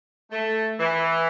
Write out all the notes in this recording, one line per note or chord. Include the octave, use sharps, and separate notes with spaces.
A3
E3